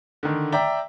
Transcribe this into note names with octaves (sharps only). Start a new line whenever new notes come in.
D3 D#3
D5 E5 G5 A#5